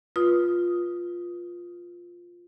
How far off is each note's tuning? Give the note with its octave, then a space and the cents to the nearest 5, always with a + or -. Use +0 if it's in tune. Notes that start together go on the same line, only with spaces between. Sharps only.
F4 +5 B4 -25 D#6 +0